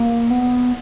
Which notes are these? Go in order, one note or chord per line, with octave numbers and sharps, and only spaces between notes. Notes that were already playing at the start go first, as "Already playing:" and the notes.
Already playing: A#3
B3